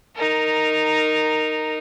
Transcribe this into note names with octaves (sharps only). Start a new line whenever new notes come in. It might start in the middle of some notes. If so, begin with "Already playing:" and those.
D#4 A#4